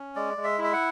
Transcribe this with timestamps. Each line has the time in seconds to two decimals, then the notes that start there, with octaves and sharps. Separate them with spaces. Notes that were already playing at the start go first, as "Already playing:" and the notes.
Already playing: C#4
0.16 G#3 D5
0.37 G#3
0.44 E5
0.58 E4
0.64 E5
0.73 F#5